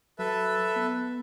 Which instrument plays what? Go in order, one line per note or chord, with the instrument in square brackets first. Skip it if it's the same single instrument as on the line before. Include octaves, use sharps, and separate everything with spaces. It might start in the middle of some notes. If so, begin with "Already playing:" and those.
[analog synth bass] F#3 [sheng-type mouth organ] A4 B4 E5
[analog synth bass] B3